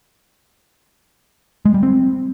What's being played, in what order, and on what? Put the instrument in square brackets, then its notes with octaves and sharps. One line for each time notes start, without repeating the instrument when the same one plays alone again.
[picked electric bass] G#3
G3
C4